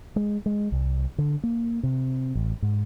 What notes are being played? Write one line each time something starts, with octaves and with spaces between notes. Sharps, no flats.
G#3
G#3
C2
D3
A#3
C3
A1
G#2